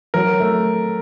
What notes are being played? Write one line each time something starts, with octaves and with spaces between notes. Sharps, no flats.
F#3 A#4
A3